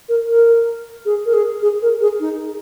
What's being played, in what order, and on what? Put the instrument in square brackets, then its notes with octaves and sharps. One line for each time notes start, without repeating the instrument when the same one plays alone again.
[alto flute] A#4
A#4
G#4
A#4
G#4
G#4
A#4
G#4
D#4